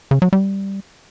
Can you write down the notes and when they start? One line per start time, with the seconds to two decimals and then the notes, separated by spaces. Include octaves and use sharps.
0.11 C#3
0.22 F#3
0.33 G3